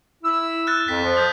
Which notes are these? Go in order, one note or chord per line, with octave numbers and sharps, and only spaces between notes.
E4 E6
F6 F#6 A6
F2 B6
F3
D#6 G6 B6